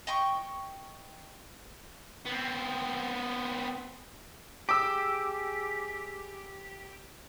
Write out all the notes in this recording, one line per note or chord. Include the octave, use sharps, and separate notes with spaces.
D#5 G5 C#6
B3 C4
G4 G#4 D6 E6